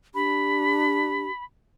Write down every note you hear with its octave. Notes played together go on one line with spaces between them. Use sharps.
D4 G4 B5